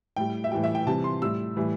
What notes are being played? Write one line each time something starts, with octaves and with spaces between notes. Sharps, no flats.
A2 G3 G5
E5
A2 E3 G3 G5
E5
G5
C3 E3 G3 A5
C6
A2 G3 E6
A2 E3 G3